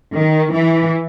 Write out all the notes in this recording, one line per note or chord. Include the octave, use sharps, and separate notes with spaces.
D#3
E3